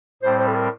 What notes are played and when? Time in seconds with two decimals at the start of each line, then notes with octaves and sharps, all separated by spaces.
0.22 A2 G3 C4 C5
0.39 C5
0.47 A4
0.55 A#4